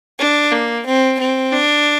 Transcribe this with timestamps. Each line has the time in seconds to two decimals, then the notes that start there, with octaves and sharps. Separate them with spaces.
0.19 D4
0.52 A#3
0.86 C4
1.19 C4
1.52 D4